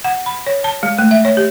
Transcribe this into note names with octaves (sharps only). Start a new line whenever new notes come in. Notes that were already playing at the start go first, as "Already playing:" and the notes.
F#5
B5
C#5
A5
G#3
A3
E5
C#5
G4